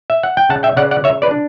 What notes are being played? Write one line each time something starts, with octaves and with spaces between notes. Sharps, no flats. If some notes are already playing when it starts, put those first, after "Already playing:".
E5
F#5
G5
C#3 F#5 A5
E5 G5
C#3 D5 F#5
D5 F#5
C#3 C#5 E5
B4 D5
D4